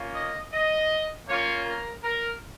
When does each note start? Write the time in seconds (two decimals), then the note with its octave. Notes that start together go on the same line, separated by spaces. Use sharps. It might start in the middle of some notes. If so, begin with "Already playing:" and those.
Already playing: A#3 C#4 F4
0.14 D#5
0.53 D#5
1.28 A#3 C#4 F4 C#5
1.65 A#4
2.03 A#4